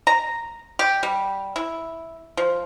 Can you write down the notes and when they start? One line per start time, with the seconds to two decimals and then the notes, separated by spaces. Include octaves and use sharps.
0.07 A#5
0.79 G4
1.03 G3
1.56 E4
2.37 F3